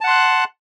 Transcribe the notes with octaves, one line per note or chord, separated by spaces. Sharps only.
F#5 A5 C6 F#6